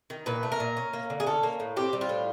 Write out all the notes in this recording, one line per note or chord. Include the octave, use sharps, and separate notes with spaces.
D#3
A#2 B4
A3
A#4
A#2
C#4
A#3
D3
G#4
C#4 A4
A#3
A2
C4 G4
G3
F4
A2